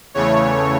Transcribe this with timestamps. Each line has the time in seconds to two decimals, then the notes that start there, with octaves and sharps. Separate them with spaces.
0.14 E2 C#3 E3 A3 C#5